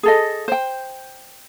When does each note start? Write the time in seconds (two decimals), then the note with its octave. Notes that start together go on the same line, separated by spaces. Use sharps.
0.03 G#4 A4 D#5
0.48 C5 G5